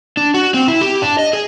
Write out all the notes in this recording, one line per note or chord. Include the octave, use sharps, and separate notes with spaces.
D4
F#4
C4
E4
G4
D4
D#5
G#4